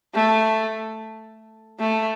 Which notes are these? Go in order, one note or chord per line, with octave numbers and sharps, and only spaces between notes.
A3
A3